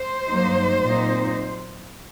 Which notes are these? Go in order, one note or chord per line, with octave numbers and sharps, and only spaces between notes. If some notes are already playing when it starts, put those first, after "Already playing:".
Already playing: C5
G2 F#3 A#3 D#4
A#2 F#3 C4 D#4